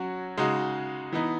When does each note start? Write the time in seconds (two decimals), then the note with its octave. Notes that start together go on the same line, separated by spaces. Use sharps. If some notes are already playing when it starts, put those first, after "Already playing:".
Already playing: F#3 C#4 F#4
0.37 C#3 G#3 D#4 F#4
1.13 E3 B3 D#4